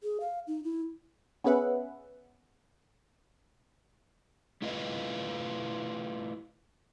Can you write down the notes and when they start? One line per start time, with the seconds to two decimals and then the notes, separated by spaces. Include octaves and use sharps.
0.03 G#4
0.20 F5
0.47 D#4
0.64 E4
1.44 B3 C#4 G#4 B4 E5 F#5
4.62 A3 E4 F4 B4 D#5